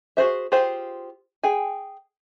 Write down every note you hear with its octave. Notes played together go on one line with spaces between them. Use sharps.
F#4 G#4 C5 E5
F4 G4 G#4 C5 F5
G#4 G5 G#5